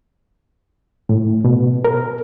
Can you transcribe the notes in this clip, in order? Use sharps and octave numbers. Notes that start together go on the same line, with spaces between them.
A2
B2
A#4